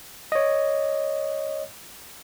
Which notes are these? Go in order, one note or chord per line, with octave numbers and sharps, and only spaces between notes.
C#5 D#5